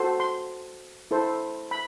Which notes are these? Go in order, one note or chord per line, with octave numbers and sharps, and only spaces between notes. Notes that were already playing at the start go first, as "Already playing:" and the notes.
Already playing: F#4 A4 C5
C6
E4 A4 C5
B5